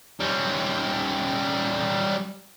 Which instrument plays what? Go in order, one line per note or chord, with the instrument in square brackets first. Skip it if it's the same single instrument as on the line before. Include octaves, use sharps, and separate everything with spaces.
[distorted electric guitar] G3 C#4